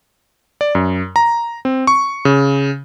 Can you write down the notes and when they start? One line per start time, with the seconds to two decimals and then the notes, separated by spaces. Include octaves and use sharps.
0.61 D5
0.75 F#2
1.16 A#5
1.65 C4
1.87 C#6
2.25 C#3